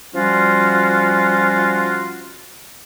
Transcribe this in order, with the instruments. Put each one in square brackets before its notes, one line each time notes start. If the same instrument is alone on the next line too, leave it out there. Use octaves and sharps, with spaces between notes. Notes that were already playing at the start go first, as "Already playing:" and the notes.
[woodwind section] F3 G3 C#4 F4 F#4